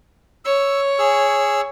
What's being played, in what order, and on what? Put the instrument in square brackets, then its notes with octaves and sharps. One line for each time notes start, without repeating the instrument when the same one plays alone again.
[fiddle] C#5 [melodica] E6
[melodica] G#4 E6